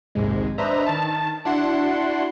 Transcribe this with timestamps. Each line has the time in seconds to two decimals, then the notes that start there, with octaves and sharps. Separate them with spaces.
0.15 A#1 D#2 G#2 C3 G#3
0.58 D4 B4 C5 D#5 E5 A#5
0.87 D#3 A5
1.45 D4 E4 F#4 F#5 C6